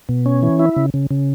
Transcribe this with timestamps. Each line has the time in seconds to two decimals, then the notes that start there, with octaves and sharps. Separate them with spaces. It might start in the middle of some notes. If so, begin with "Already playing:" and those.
0.09 B2
0.26 C#4
0.43 E3
0.59 E4
0.76 C#3
0.94 C#3
1.11 C#3